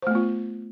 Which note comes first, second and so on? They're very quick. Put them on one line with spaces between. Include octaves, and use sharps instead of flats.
C5 A3 B3 F4